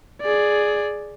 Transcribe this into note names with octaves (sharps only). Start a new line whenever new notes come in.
G#4 D5